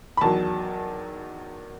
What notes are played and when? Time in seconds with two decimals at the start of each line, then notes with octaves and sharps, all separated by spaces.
0.17 B5
0.21 E2 D#3 F#3 A5